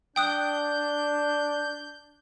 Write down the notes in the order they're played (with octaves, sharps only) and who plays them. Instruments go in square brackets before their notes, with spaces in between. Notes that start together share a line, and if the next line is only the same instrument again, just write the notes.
[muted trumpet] D4 [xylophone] G5 D#6 F#6 [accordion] G6